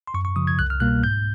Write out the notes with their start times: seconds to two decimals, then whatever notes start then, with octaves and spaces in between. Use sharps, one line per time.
0.07 C6
0.14 F#2 C#6
0.25 C#6
0.36 C#3 F3 D#6
0.47 G#6
0.59 C2 F#6
0.70 F6
0.80 B2 G3 A#3 F#6
1.03 G#2 G6